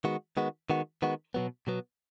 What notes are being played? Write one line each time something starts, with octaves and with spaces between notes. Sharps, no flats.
D#3 G#3 B3 F#4
D#3 G#3 B3 F#4
D#3 G#3 B3 F#4
D#3 G#3 B3 F#4
B2 F#3 B3
B2 F#3 B3